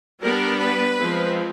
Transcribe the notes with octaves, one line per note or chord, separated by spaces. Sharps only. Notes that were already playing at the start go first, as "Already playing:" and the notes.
G3 B3 D4 A#4
B4
F3 G#3 C4